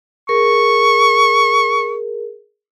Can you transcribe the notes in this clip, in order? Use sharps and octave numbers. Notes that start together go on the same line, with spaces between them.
G#4 A#4 C#6